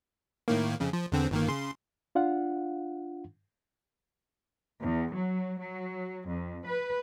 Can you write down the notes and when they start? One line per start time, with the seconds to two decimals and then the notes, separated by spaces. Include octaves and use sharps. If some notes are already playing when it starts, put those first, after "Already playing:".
0.48 A2 D#3 A#3
0.80 F2 C#3
0.93 F3
1.12 E2 D3 C4
1.31 G1 D#3 A#3
1.48 C#3 C6
2.15 D4 F4 F5 F#5
4.80 E2
5.14 F#3
5.58 F#3
6.27 F2
6.66 B4